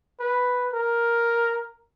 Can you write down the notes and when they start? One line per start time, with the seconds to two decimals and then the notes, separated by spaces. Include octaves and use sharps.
0.20 B4
0.73 A#4